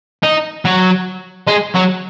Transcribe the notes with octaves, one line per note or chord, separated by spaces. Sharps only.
D#4
F#3
G#3
F#3